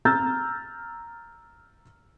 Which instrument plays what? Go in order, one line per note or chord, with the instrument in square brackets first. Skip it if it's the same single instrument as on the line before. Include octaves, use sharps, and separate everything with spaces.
[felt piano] A#5 E6 F6 G6 A6